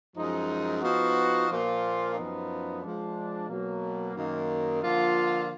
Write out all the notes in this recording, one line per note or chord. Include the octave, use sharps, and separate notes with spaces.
F#2 F3 G#3 D#4
F3 B3 D#4 F#4
A#2 F3 A#3 F4
F#2 F3 B3 D#4
F3 G#3 D4
B2 F#3 A#3
F#2 D#3 A#3
D3 F3 A#3 F4